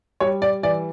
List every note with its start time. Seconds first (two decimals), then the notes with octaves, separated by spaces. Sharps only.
0.20 G3 C#5
0.42 D5
0.63 E3 D5